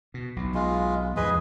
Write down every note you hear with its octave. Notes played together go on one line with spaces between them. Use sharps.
B2
B1 B2
G#3 F4
E2 G#2 F3 G#4 B4 D#5